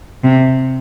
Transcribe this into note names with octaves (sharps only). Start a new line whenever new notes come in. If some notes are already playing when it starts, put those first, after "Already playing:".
C3